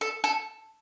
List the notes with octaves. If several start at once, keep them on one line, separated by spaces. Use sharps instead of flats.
A4
A4